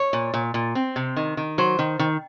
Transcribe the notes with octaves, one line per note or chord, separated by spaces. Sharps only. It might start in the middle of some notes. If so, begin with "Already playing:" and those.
Already playing: C#5
A#2
A#2
A#2
C4
C3
D#3
D#3
F#3 C5
D#3
D#3